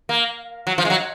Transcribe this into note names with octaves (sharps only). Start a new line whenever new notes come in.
A#3
F#3
F3
G#3
F#3